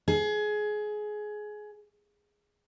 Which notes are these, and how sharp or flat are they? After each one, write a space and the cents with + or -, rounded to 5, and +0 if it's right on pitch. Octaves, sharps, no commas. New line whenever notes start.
G#4 +20